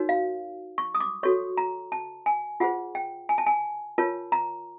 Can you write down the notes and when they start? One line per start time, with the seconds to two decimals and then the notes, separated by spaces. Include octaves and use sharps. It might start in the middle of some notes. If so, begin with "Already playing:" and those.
Already playing: D#4 F#4 A#4 C#5
0.09 F5
0.78 C#6
0.95 D#6
1.00 D6
1.23 F#4 A4 C#5 C#6
1.57 A#5
1.92 A5
2.26 G#5
2.60 F4 G#4 C5 F#5
2.95 G5
3.29 G#5
3.38 A5
3.47 G#5
3.98 F4 A#4 C#5 A5
4.32 A#5